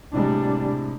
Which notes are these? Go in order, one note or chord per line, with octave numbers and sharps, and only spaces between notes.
A2 C3 G3 G#3 D4